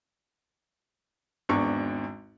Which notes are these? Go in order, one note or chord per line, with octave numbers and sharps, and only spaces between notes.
G#1 E2 D4 C#6